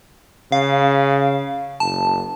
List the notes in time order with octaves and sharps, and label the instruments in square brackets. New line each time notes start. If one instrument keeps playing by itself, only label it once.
[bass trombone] C#3 [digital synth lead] F5
[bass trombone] F#1 [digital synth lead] A5